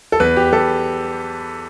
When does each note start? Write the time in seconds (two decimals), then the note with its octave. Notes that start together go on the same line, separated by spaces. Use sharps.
0.12 A4
0.20 E2 B4
0.36 G4
0.52 E2 A4